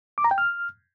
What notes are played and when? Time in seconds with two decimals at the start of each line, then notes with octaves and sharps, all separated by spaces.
0.18 D6
0.24 A#5
0.31 G5
0.38 F6